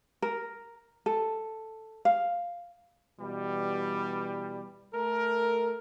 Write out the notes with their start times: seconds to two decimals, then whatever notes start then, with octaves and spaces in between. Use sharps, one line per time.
0.22 A#4
1.06 A4
2.05 F5
3.20 B2 E3 G3
4.94 A3 A4 A#4